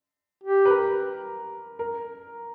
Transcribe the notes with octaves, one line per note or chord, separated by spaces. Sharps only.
G4
B4
A#4
A#4